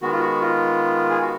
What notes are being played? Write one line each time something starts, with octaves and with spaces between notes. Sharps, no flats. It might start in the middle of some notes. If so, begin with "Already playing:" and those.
D#3 G#3 B3 F#4
F4
F#4
F4
G#4
F#4